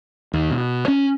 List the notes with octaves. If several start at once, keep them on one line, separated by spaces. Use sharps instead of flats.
D#2
B2
C#4